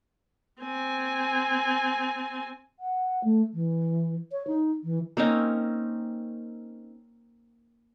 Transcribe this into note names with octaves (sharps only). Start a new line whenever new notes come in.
C4 G#5
F#5
A3
E3
C#5
D#4
E3
A#3 C4 C#4 D#4